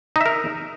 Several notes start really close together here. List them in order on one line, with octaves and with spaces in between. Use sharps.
D#4 E5 A#4